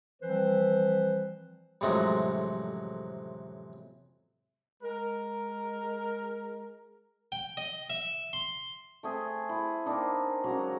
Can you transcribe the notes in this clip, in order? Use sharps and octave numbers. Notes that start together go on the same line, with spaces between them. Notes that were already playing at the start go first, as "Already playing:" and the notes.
E3 F3 G3 C4 B4 C5
A1 F2 C3 F#3 G#3 A3
G#3 A#4
G5
D#5
E5
C6
A3 C4 G#4 E5
E4 G#4
A#3 C4 D4 D#4
C#3 F#3 G#3 A#4